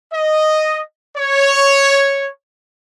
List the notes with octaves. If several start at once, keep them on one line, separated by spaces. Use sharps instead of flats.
D#5
C#5